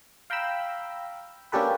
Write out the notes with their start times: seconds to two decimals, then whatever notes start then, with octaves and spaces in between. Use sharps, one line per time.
0.30 F5 G5 A#5 B5 E6
1.52 A#3 C#4 D4 G4 A4 B4